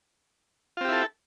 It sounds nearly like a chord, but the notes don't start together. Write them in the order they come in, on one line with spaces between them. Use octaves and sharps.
F4 C4 G4 E4 A4